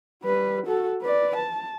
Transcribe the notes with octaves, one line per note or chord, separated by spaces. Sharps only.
G3 B4
F#4 A4
B4 D5
A5